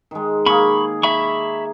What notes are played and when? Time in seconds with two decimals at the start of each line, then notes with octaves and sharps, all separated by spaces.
0.11 D#3 G#3
0.46 A#3 G#4 B5 C#6
1.03 E5 B5 C#6